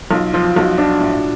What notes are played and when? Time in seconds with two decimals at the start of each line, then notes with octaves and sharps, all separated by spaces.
0.11 B1 F4
0.33 F3 F4
0.45 F4
0.56 B1 F#4
0.78 F3 D4
1.00 A2